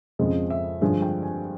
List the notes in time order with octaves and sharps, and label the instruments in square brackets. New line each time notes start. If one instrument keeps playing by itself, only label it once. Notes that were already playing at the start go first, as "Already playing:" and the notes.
[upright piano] F2 C#3 F3 G#3 D#5
E5
G2 D3 F3 G#3 G#5
G5
G#5